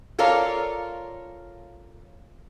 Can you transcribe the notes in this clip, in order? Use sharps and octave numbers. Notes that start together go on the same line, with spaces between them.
F4 A4 A#4 C#5 D5 F5